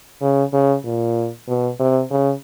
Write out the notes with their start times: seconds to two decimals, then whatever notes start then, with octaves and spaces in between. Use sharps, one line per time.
0.21 C#3
0.53 C#3
0.84 A#2
1.48 B2
1.79 C3
2.11 C#3